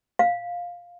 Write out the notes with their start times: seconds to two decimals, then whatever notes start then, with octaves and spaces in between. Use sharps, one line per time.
0.19 F5